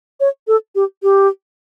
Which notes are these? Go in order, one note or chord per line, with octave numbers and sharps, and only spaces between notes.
C#5
A4
G4
G4